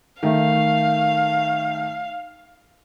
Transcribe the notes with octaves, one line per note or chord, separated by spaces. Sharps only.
D#3 A3 F5